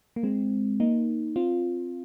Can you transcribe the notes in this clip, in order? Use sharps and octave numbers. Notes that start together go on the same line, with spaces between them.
A#3
G#3 C4
A#3 D#4
C4 F4